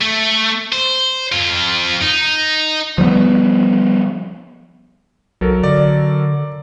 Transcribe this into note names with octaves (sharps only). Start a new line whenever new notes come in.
A3
C5
F2 F4
D#4
F3 G3 A#3 B3
B1 F#3 A4 A#4
D3 D5